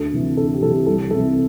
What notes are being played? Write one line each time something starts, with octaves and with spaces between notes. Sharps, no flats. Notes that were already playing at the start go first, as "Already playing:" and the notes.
Already playing: D2 A4
C3 E3
D2 A4
G4
C3 E3 A4
G4
C2 A4
C3 E3 A4